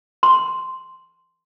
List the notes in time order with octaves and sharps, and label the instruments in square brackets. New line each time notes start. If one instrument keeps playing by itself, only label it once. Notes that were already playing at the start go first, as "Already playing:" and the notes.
[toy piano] C6